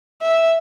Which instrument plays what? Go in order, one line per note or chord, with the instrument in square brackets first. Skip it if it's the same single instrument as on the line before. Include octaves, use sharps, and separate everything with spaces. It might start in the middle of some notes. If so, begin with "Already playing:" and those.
[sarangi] E5